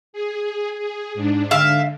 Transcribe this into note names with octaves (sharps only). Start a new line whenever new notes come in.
G#4
G#4
G#2 D4
D3 E5 F5